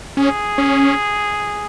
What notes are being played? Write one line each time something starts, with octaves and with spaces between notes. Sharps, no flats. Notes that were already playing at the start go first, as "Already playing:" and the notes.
C#4 G#4
C#4